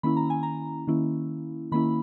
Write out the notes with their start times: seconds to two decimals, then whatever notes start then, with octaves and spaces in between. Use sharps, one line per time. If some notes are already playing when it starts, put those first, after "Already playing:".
0.03 D#3 A#3 C#4 E4 B5
0.17 A#5
0.30 G#5
0.43 A#5
0.87 D#3 A#3 C#4 E4
1.72 D#3 A#3 C#4 E4 B5